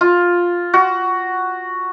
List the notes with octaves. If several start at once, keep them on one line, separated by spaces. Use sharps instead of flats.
F4
F#4